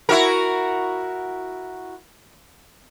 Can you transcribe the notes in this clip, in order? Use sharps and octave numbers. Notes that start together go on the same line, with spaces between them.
E4 F#4 A#4